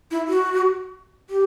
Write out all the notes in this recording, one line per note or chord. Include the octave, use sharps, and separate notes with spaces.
E4
F#4
G4